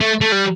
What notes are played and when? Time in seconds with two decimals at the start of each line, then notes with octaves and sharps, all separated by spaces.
0.01 A3
0.21 A3
0.32 G3